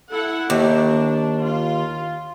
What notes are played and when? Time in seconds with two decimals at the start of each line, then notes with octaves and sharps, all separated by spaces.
0.10 E4 A4 F#5
0.50 D#2 D4
1.42 F4